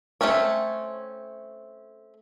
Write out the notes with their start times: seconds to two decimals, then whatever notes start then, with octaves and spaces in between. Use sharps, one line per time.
0.21 A3 C4 C#4 C#5